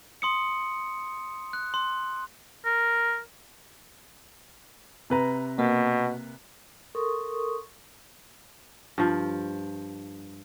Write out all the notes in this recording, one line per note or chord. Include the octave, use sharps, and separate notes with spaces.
C6 D#6 C#7
F#6
C6
A#4
C3 B4 A#5
B2 A#3
A4 A#4 C6 C#6 D#6
G2 F3